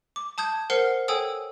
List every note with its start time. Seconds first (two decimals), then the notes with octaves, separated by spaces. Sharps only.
0.16 D6
0.38 A5 D#6 G6 G#6
0.70 A#4 C5 F#5 F6 C7 C#7
1.08 A4 C#5 G5 G#5 D#6 E6